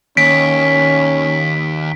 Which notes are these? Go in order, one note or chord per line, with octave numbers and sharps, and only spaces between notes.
D#2 C#4 B6 D7